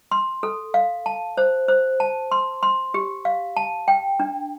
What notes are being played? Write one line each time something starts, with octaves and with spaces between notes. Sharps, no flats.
C6
A4
F5
A5
C5
C5
A5
C6
C6
G4
F5
A5
G5
D4